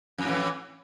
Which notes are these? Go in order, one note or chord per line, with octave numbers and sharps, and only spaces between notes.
F2 A2 E3